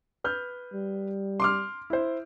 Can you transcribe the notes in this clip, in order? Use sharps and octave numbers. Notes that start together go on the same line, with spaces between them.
B4 F6 G6
G3
C6 D6 F6
E4 C5